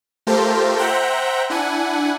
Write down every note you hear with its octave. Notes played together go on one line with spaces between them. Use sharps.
A3 F4 G4 A4 A#4 C5
C5 E5 F#5 G5 A#5
D4 E4 F#5 G#5